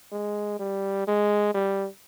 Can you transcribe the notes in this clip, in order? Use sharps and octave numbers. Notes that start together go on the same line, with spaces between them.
G#3
G3
G#3
G3